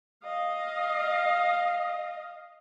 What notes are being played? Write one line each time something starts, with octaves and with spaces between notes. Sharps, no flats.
D#5 F5